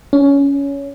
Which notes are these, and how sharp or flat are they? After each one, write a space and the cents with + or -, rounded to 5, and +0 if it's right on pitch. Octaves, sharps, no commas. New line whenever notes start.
C#4 +15